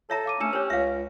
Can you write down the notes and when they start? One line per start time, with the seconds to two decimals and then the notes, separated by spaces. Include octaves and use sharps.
0.10 A4 C#5 E5 A#5
0.25 F5 D6 D#7
0.40 A3 C#4 D4 E6 C#7 E7
0.53 G4 C5 C#5
0.70 C#2 C#5 E5 F5